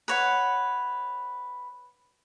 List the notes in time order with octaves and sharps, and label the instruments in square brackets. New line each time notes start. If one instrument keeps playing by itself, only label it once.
[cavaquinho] B4 C#5 F#5